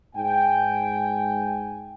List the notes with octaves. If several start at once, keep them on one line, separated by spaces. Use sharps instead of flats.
G#2 G5 G#5